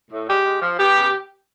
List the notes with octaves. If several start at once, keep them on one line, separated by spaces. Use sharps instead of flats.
A2
G#3 G4
G#3
F3
B3 G4
C#3